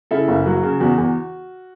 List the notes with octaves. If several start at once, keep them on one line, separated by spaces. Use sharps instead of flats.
C#3 E4 A4
F#1
F#3 F#4
C#3
E2 F#4
E2